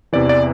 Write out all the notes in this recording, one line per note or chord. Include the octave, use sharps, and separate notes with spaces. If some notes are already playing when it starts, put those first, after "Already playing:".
E2 C3 E3 D5
D5